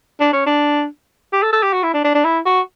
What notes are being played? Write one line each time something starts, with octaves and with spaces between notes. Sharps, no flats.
D4
C#4
D4
G4
A4
A4
G4
F#4
E4
D4
D4
D4
E4
F#4